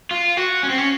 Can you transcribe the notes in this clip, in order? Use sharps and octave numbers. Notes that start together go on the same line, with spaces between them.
F4
F#4
C#4
C4
C#4